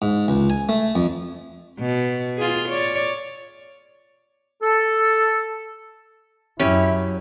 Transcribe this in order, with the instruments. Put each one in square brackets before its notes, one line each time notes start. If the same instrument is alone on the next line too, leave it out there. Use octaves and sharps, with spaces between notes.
[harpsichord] G#2
C#2
G#5
A3
F2
[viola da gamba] B2
F4 G#4
C#5 D5
[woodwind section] A4
[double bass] F#2 [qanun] C#4 G4 [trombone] E4 [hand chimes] C#5